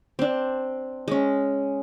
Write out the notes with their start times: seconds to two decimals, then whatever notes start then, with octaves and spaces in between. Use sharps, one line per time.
0.19 C4 D4
1.08 G#3 C#4